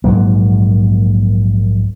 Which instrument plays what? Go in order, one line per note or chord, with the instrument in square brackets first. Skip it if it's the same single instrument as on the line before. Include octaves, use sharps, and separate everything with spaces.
[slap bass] A#1 G#2 F#3 A#3